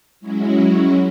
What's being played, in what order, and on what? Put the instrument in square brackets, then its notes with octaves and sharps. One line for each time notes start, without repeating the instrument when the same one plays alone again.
[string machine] F#3 G#3 C#4 E4 F#4